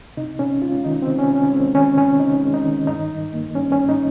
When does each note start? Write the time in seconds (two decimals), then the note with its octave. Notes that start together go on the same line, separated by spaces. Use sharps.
0.17 C3 D#4
0.39 C3 C#4
0.62 G#3 F4
0.84 D#3 D#4
1.02 C4
1.08 C3
1.19 C#4
1.29 C3
1.35 C#4
1.52 G#3 C4
1.74 D#3 C#4
1.97 C3 C#4
2.19 C3 D#4
2.43 G#3
2.54 D#4
2.66 D#3
2.87 G2 D#4
3.11 G2
3.33 A#3
3.55 G3 C#4
3.72 C#4
3.78 G2
3.89 D#4